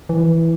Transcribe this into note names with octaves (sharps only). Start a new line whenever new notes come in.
E3